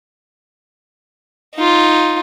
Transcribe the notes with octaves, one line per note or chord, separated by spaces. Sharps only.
D#4 F4